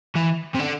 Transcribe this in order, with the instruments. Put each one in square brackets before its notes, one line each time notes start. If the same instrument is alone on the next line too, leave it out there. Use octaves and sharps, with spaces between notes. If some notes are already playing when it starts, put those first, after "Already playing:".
[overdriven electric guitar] E3
C3
D3